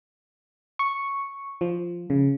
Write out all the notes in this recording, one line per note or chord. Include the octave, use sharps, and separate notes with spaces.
C#6
F3
C#3